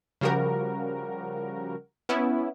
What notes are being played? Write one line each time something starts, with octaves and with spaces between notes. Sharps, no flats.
C#3 F3 G3 F#4 A#4
B3 C#4 E4